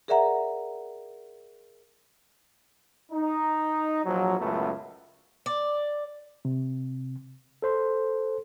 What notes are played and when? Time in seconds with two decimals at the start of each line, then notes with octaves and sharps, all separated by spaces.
0.08 G#4 A#4 D5 E5 F#5 A#5
3.12 D#4
4.05 A#1 F3 F#3
4.40 C#2 F#2 A2 A3 B3
5.46 D5
6.45 C3
7.62 A4 C5 C6